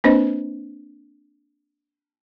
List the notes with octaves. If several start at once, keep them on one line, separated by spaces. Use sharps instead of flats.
A#3 C4 D4 B4 C5 D#5